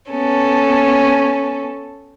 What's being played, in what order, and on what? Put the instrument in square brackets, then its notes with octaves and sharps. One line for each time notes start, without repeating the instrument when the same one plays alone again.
[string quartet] B3 C#4 A4